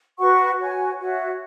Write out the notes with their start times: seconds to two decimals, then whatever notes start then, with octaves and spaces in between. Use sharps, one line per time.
0.19 F#4 B4 F#5 C#6
0.59 F#4 C#5 G#5
0.98 F#4 C#5 E5